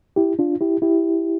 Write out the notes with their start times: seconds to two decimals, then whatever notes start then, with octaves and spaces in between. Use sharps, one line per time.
0.16 E4 G4
0.39 D4 F4
0.61 E4 G4
0.82 E4 G4